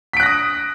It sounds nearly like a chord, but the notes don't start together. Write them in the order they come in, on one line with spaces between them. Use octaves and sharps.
B6 D7 F#6 A#6 D#6